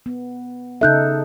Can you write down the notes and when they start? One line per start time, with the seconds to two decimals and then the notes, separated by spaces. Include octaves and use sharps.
0.06 B3
0.81 C#3 D#4 A4 E5 F#6 G6